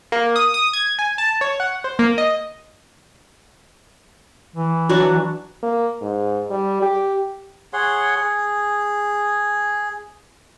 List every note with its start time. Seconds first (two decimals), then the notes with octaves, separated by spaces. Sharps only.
0.12 A#3
0.36 D#6
0.54 D#6
0.73 G#6
0.99 G#5
1.18 A5
1.41 C#5
1.60 F#5
1.84 C5
1.99 A#3
2.18 D#5
4.56 E3
4.89 F#3 D4 F#4
5.03 E3
5.63 A#3
6.02 G#2
6.50 G3
6.82 G4
7.73 G#4 C#5 F#5 C6
8.16 G#4